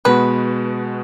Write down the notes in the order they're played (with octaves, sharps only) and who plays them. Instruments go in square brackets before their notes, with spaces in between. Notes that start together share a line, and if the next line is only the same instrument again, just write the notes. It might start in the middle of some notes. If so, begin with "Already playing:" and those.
[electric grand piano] B2 G#3 B3 F#4 [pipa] B4